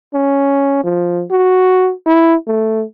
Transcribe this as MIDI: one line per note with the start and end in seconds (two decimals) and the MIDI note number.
0.14 0.81 61
0.84 1.23 53
1.31 1.92 66
2.06 2.35 64
2.47 2.83 57